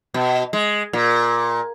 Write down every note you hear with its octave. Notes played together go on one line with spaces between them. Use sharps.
B2
G#3
A#2